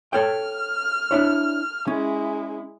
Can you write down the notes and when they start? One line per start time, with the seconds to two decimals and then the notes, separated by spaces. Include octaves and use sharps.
0.13 A4 C#5 G5 F6
1.11 D4 E4 C#5
1.88 G#3 C#4 E4